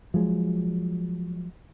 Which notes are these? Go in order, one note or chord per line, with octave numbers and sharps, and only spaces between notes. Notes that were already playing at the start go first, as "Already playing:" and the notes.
F3 F#3 G#3